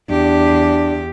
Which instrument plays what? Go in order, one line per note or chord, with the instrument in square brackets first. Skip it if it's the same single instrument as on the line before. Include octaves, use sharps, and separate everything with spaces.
[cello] E2 G4 [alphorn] D4